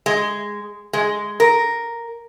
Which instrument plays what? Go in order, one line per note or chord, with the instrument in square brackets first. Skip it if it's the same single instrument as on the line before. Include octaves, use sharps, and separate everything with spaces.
[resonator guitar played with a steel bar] G#3
G#3
A#4